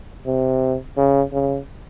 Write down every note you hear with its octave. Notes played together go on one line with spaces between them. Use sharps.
C3
C#3
C#3